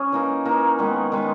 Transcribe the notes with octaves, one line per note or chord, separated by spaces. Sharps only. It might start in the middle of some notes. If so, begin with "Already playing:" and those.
Already playing: C#4 G#4
E3 A#3 D#4
E3 A#3 D#4
D#3 G#3 B3
D#3 G#3 B3